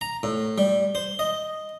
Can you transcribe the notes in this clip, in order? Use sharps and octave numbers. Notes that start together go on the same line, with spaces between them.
A#5
A2
G3
C5
D#5